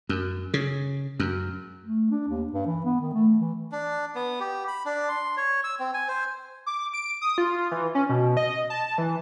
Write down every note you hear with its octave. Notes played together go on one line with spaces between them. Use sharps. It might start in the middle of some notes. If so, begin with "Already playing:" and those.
F#2
C#3
F#2
A3
D4
D#2
G2
E3
B3
D#3
A3
E3
D4
B3
G4
B5
D4
C6
C#5
E6
C4
G#5
C5
D6
D7
D#6
F4
E3
C#4
B2
D#5
A5
E3